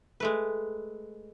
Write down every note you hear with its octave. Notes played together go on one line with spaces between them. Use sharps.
G#3 A3 B4